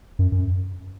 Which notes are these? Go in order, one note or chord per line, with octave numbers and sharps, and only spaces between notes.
F#2
F#2